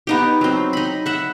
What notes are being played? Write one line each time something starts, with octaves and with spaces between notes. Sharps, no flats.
B3 D#4 G4
F#3 C4
D#4 B5
E5 F#5